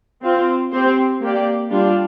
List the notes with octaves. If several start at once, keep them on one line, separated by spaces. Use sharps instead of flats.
C4 F4 C5
C4 G4 C5
A#3 G4 D5
G3 D4 F4